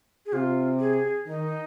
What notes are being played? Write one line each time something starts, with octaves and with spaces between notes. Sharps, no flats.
G#4
C3 F4
G#4
D#3 D#4